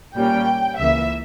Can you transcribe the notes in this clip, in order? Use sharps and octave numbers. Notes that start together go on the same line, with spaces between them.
A#2 G3 A#3 C#4 G5
C#2 C#3 E3 A#3 E5